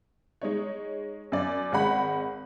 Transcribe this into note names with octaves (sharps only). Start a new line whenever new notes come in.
G#3 D#4 C#5
F#2 D5
G#1 G#3 F#5 B5